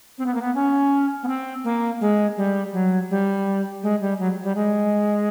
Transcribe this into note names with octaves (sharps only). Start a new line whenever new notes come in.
C4
B3
A#3
B3
C#4
B3
C4
A#3
G#3
G3
F#3
G3
G#3
G3
F#3
G3
G#3